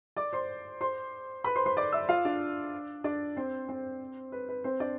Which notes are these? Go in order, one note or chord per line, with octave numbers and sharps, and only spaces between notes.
D5 D6
C5 C6
C5 C6
B4 B5
C5 C6
C5 C6
D5 D6
E5 E6
F4 F5
D4 D5
D4 D5
C4 C5
C4 C5
B4
B4
C4 C5
D4 D5